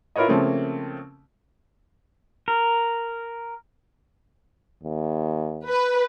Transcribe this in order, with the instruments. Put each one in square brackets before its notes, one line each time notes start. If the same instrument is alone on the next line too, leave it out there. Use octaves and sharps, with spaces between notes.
[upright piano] E4 F4 A#4 B4 C#5 D#5
C#3 F3 A3 A#3 C4 C#4
[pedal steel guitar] A#4
[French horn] D#2
[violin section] B4